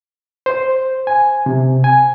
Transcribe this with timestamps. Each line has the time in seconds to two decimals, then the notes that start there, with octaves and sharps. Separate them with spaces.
0.46 C5
1.07 G#5
1.46 C3
1.84 G#5